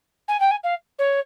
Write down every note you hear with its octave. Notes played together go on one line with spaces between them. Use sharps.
G#5
G5
G#5
F5
C#5